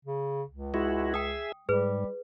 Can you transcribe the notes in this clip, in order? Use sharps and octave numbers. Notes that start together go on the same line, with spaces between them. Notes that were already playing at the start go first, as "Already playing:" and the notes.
C#3
C#2
G#3 E4 F#4
G#4 E5 G5 D#6
G#2 G3 G#4 B4